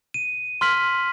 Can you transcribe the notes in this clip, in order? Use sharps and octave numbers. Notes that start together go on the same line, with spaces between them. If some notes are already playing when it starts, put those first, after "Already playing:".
D#7
C6 F6 B6 F#7